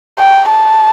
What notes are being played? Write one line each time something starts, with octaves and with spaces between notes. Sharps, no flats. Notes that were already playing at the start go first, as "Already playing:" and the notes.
G5
A5